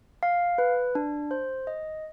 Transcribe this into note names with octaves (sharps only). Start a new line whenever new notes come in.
F5
B4
D4
C5
D#5